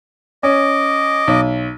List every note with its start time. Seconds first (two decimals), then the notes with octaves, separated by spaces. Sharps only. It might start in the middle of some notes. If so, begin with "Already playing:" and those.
0.43 C#4 D#5 D6
1.28 B1